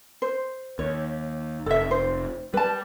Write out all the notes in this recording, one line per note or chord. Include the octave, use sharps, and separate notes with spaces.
C5
D#2 C#5
F1 A4 E5
C5
G3 B4 A5